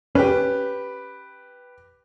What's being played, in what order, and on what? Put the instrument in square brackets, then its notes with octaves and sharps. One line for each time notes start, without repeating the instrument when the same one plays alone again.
[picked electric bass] C#4 [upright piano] G4 B4